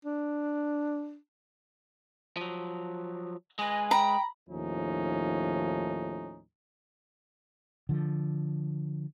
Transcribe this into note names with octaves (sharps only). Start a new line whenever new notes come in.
D4
F3 F#3
G#3 B4 D#5 G#5
G5 A#5 B5
D#2 A2 F3 C#4 D#4
D3 F3